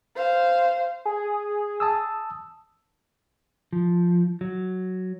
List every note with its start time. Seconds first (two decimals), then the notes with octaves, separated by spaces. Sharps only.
0.16 C5 F5
1.05 G#4
1.80 A5 D#6 E6
3.73 F3
4.41 F#3